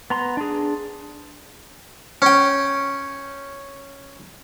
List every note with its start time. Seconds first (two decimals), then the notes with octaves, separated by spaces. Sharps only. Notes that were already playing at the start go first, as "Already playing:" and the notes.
0.10 B3 A#5 C6
0.37 D4 G#4
2.22 C#4 G5